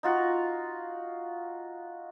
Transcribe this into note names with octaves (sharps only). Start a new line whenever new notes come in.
D#4 F4 F#4